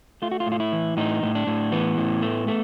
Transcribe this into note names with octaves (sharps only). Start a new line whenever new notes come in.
A3 F4
F#4
F4
A2
F4
E4
E3
A2 D#4
A2
D4
A2
E3 B3
A2
A3
A3